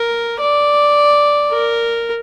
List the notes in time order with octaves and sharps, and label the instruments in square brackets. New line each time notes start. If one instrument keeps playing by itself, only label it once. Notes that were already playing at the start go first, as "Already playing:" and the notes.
Already playing: [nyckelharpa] A#4
D5
A#4